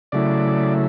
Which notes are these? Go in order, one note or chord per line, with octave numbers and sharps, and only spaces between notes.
C#3 F#3 A3 E4 D5